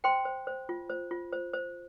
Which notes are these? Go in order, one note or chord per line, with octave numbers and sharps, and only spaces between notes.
C5 G5 C6
C5
C5
F4
C5
F4
C5
C5